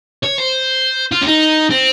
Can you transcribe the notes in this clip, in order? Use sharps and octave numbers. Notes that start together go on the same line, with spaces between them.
C#5
C5
F4
C#4
D#4
C4